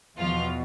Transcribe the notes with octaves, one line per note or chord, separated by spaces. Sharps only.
E2 B2 F3 F4